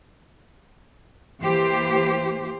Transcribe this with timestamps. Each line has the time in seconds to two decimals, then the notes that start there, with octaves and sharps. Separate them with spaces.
1.42 E3 A#3 G4 C5